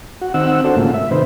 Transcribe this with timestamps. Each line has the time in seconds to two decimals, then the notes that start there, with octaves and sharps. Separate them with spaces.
0.21 F#4
0.34 D#3 C4 F#5 E6
0.64 D4 F#4 A4 C5
0.76 G#2 C#3 A3 A#3 F4
0.94 E5
1.11 C3 D#3 B4 C5